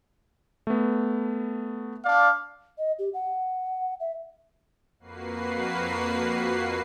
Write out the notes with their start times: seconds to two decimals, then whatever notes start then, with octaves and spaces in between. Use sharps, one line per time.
0.67 A3 B3
2.05 D4 D5 F5
2.78 D#5
2.99 G4
3.14 F#5
4.00 E5
5.00 F2 A#3 F#4 B4 C7